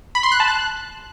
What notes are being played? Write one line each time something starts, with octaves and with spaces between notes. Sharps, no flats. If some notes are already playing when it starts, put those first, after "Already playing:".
B5
C6
F#6
A5
F#6